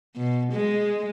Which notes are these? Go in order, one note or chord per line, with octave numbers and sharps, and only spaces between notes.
B2
G#3